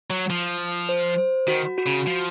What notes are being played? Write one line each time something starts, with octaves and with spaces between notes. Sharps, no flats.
F#3
F3
C5
C5
D#3 F#4
F#4
C#3
F3